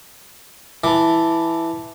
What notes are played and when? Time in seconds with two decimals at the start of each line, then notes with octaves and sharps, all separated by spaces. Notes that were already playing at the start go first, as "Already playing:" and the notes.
0.84 E3 A5 D6